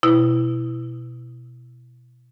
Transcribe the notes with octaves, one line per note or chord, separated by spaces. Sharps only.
B2 E4 E6